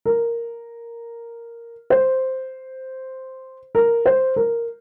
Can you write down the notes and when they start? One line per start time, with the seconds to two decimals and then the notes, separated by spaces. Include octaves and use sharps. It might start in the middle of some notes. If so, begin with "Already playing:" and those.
0.06 A#4
1.90 C5
3.75 A#4
4.06 C5
4.36 A#4